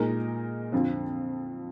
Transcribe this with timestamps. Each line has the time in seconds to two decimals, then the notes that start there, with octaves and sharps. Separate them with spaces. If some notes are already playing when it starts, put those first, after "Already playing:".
Already playing: A#2 G#3 D#4 A#4
0.72 F2 D3 F3 C4 F4